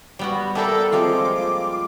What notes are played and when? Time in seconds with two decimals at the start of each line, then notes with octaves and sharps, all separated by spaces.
0.19 G3 B3 F#4
0.55 A#3 A4 A#4 D5 E5 G5
0.92 F3 G#3 C4 F4 D6